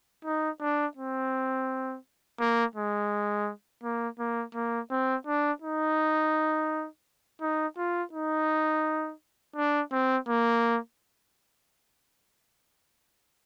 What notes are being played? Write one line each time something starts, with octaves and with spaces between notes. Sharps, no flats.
D#4
D4
C4
A#3
G#3
A#3
A#3
A#3
C4
D4
D#4
D#4
F4
D#4
D4
C4
A#3